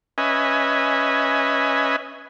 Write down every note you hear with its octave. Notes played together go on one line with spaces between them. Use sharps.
C#4 B4 D#5 E5 G#5